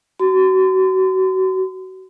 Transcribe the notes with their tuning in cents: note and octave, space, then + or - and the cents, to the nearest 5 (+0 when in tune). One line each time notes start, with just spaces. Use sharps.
F#4 +30 C6 -35